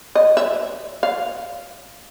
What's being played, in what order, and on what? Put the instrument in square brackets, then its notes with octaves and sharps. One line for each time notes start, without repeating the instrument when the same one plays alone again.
[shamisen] D#5
E5
F5